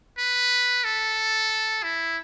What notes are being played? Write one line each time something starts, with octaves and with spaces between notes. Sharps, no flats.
B4
A4
E4